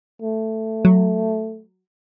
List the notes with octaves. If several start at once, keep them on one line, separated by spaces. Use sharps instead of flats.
A3
F#3